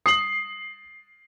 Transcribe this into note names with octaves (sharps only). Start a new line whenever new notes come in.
D#6 C7 F#7